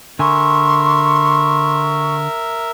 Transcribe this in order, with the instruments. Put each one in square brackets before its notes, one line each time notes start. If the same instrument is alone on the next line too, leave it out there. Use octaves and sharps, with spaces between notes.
[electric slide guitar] D3 G#5 [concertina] A#4 E5 [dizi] C6 [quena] C#6